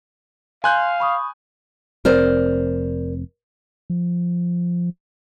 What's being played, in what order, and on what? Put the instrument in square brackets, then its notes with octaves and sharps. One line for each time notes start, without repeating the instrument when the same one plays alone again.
[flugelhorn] F5 [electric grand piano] G#5 F#6 G6 [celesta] C6
[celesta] B5 C#6 D#6
[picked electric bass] F1 C4 [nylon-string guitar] A#4 C5 D5
[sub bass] F3